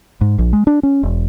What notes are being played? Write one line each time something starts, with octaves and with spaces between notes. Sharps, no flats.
G#2
A#1
G#3
D4
C#4
E1